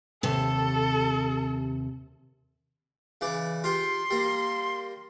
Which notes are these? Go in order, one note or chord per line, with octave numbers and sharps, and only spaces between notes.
D#2 C3 A4
C#3 E3 D5
F4 G4 C6
G3 A#3